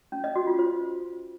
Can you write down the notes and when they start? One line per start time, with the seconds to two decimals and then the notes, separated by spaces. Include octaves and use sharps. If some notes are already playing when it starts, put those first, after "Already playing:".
0.12 C#4
0.24 D#5
0.35 F#4
0.47 F4
0.59 C5